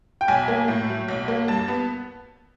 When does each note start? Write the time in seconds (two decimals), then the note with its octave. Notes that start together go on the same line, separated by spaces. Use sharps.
0.21 G5
0.28 B1 G#5
0.48 A#3
0.68 A2
0.89 F#3
1.08 B1
1.28 A#3
1.48 G2 A5
1.68 B3